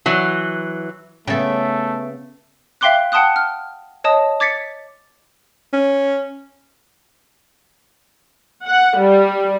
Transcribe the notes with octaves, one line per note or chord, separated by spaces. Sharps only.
E3 F#3
C#3 A3 B3 A4 E5 G5
E5 F5 G5 C6 D6 F#6
F#5 G5 A5 C6 D#6 F#6
F6
C#5 D#5 A5 D#6
D6 G#6 A6 B6 C#7
C#4
F#5
G3